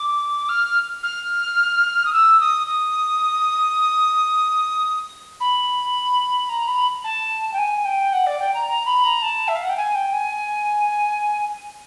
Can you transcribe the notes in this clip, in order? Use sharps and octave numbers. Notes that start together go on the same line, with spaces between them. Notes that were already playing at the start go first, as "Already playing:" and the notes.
Already playing: D6
F6
F6
D#6
E6
D#6
D#6
B5
A#5
B5
A5
G5
G#5
G5
F#5
D5
G5
A#5
A#5
B5
A#5
A5
E5
F5
F#5
G5
G#5
G5
G#5